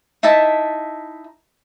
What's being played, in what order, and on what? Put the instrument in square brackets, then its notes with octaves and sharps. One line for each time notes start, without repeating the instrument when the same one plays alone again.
[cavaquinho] D#4 E4 E5 A5